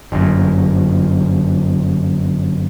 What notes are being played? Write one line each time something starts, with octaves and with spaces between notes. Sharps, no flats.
G1 F#2